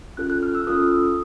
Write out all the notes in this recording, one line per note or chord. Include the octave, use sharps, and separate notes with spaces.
C#4 F4 A4 F#6
F#6
F6
E6
C#4 F4 A4 D#6